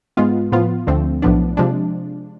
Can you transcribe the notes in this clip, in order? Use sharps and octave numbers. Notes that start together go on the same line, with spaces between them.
G#2 G#3 B3 F4
A2 F3 B3 F4
D2 D3 F3 A3 C4
B1 A2 F3 B3 D4
C3 F3 G#3 D4